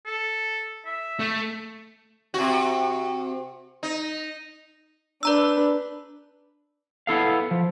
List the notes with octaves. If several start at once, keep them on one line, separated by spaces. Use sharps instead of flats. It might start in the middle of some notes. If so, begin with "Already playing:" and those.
A4
E5
A3
C3 F#4
D#4
D4 B4 D5 A#5 E6
B3 E4 A4 F5
F3